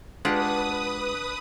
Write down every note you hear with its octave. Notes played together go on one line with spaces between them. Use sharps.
G#3 D4 F4 G4 B4 F#5 D#6